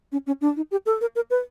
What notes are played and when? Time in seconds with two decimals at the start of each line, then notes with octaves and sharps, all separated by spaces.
0.12 C#4
0.27 C#4
0.41 D4
0.56 D#4
0.71 G4
0.86 A4
1.01 A#4
1.15 A#4
1.30 B4